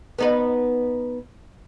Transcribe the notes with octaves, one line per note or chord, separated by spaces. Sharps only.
B3 D#4 B4